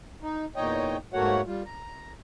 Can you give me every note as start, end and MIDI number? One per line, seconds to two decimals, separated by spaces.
0.23 0.45 63
0.56 0.97 40
0.56 0.97 46
0.56 0.97 63
0.56 0.97 73
0.56 0.97 75
0.56 0.97 79
1.13 1.41 44
1.13 1.41 57
1.13 1.41 58
1.13 1.41 66
1.13 1.41 73
1.13 1.41 78
1.47 1.62 55
1.47 1.62 65
1.66 2.12 82